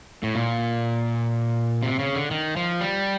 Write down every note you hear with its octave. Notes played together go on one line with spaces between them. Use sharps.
A2
A#2
C3
C#3
D3
D#3
F3
G3